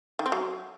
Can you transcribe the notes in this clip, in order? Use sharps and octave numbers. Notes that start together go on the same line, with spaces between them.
D#3
C4
F#3